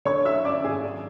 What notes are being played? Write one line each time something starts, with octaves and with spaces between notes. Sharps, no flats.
D3 C#5 C#6
F#3 E5 E6
F#2 D5 D6
G#1 G#4 G#5
F#3